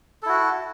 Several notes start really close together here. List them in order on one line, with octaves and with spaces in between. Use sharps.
A4 E4 F#4